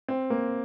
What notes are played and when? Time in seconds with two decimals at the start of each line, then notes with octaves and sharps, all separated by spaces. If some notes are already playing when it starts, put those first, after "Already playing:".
0.08 C4
0.30 A#3